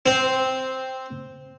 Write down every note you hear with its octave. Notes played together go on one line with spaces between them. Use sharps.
C4